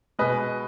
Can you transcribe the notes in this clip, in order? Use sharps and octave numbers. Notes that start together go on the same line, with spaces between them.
B2 G#3 B4 D#5